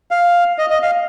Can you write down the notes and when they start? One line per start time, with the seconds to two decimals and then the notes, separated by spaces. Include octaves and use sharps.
0.11 F5
0.58 D#5
0.70 D#5
0.82 F5